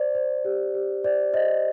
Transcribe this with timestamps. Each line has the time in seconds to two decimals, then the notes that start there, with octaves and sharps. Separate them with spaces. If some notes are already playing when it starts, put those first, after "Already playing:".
Already playing: C5 D5
0.15 C5
0.45 G4
0.74 G4
1.04 C5 D5
1.33 C5 D#5